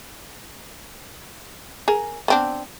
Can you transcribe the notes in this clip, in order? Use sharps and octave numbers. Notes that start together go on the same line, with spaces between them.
G#4 A#4
B3 C4 D4